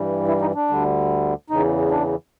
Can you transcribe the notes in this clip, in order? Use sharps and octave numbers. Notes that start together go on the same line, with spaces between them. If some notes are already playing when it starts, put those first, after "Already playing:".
Already playing: G2 E3 G3
E4
D#4
D4
D2 D3 G3
E2 C#3 E3 D#4
D4